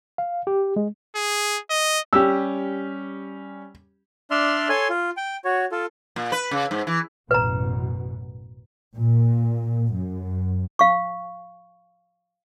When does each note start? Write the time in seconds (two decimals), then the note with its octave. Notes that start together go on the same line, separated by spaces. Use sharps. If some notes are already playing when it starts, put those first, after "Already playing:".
0.18 F5
0.47 G4
0.76 G#3
1.16 G#4
1.71 D#5
2.13 G3 C#4 G4 E6
4.31 D4 D5 E5 C6 F6
4.69 A4 C#5 G#5 C6
4.90 F4
5.17 G5
5.45 F#4 C#5
5.72 F4 A4
6.16 A#2
6.32 B4
6.51 C#3
6.71 G#2
6.87 E3
7.31 A1 F#2 B2 B4 A#5
8.97 A#2
9.93 F#2
10.79 F5 C#6